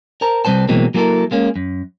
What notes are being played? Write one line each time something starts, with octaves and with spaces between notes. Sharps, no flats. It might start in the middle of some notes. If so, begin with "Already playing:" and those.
A#4 C5 A5 A#5
C3 G3 B4 C5 A5
B2 E3 F#3 G#3 A#3 C4
F#3 A#3 E4 G4 A4 A#4
G#3 A#3 C#4
F#2